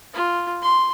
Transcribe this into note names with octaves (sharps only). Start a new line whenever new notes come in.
F4
C6